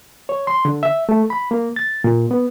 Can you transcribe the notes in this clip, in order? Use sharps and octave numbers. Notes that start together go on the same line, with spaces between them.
C#5
C6
D3
E5
A3
B5
A#3
A6
A#2
B3